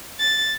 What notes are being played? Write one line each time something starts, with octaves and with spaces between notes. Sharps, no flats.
A6